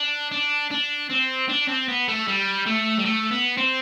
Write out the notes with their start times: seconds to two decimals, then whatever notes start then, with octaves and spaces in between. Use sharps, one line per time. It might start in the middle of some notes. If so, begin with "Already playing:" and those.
Already playing: D4
0.32 D4
0.71 D4
1.11 C4
1.49 D4
1.68 C4
1.88 B3
2.08 A3
2.28 G3
2.66 A3
2.98 G3
3.05 A3
3.31 B3
3.57 C4